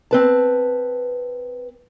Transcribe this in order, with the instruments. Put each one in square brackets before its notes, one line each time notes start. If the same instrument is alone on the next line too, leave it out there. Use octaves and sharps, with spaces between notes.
[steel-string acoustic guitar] C4 B4 A5